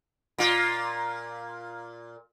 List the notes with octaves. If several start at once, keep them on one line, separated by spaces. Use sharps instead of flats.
A#2 F4